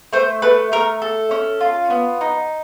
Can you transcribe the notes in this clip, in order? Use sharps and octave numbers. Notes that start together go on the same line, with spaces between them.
A3 C5
A3 B4
A3 A#4
A4
C#4
F4
B3
D#4